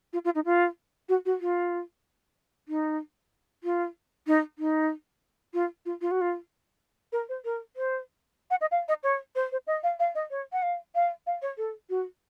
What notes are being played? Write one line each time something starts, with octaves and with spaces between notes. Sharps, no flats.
F4
F4
D#4
F4
F#4
F#4
F4
D#4
F4
D#4
D#4
F4
F4
F4
F#4
F4
A#4
C5
A#4
C5
F#5
D#5
F5
D#5
C#5
C5
C5
D#5
F5
F5
D#5
C#5
F#5
F5
F5
F5
C#5
A4
F#4